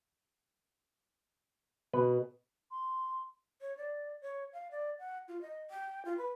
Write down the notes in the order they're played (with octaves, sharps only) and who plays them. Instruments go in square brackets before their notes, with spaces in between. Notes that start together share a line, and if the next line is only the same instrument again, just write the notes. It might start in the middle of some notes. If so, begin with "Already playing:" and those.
[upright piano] B2 [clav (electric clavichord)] B4
[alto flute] C6
[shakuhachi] C#5
D5
C#5
F5
D5
F#5
F4
D#5
G5
F4
B4